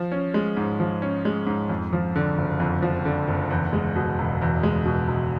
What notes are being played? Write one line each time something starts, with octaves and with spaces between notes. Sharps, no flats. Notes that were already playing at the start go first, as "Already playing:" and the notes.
Already playing: F3
C#4
G#3
G#2
F3
C#4
G#3
G#2
F2
F3
D3
F#1
F2
F3
D3
F#1
E2
G#3
B2
E1
E2
G#3
B2
E1